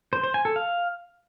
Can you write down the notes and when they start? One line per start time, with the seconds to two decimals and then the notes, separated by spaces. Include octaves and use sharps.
0.13 C5
0.23 C5
0.34 G#5
0.45 A4
0.56 F5